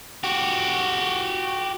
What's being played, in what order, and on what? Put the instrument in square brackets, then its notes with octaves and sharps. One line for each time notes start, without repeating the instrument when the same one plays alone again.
[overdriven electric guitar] F#4 G4